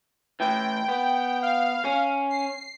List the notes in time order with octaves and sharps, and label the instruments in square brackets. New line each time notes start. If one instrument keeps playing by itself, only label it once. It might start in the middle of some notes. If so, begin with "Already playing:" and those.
[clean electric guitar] A2 E3 [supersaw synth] G5
[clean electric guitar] B3
[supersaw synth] F5
[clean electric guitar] C#4
[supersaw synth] C7